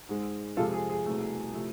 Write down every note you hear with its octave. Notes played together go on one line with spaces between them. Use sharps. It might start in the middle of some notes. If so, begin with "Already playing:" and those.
G#2 G#3
F2 C3 G#3 F4 A4
G#4
G#4
C2 B2 A3
C3 F3 A3